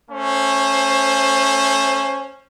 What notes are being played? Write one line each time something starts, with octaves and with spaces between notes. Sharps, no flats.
A3 C#4 C5